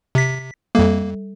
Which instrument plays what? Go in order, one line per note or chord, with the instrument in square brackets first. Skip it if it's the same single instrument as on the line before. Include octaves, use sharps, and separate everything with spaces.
[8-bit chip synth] C3 B6
[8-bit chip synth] F2 A#3 [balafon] G3 A4